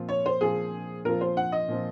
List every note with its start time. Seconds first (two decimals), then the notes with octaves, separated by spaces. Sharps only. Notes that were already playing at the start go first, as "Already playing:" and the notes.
Already playing: A#2 F3 C4 F4
0.09 C#5
0.26 C5
0.41 A#2 F3 C4 F4 G#4
1.05 A#2 F3 C4 F4 A#4
1.21 C5
1.37 F#5
1.52 D#5
1.69 A#2 F3 C4 F4